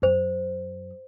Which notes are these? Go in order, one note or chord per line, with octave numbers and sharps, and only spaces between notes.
F#2 C5